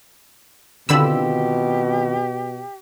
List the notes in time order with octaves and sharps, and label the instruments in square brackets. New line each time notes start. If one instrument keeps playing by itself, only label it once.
[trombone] B2 [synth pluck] D3 B5 E6 [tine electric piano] D#3 C4 F4 [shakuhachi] G4